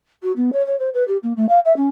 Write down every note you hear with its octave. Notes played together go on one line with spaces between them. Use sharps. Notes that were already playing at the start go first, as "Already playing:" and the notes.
F#4
B3
C#5
C#5
C5
B4
G4
A#3
A3
F5
E5
C#4